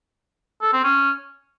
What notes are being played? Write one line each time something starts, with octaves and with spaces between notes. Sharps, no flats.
A4
C4
C#4